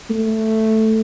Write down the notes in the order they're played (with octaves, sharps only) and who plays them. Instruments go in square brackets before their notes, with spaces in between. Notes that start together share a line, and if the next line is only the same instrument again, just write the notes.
[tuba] A3